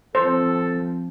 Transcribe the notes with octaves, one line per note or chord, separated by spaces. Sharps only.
F3 C4 A4 C5